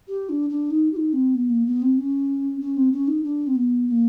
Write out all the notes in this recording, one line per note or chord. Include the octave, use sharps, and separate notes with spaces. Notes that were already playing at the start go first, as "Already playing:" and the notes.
G4
D4
D4
D#4
G4
D#4
C4
B3
A#3
B3
C4
C#4
C#4
C4
C#4
D#4
D4
C4
B3
B3
A#3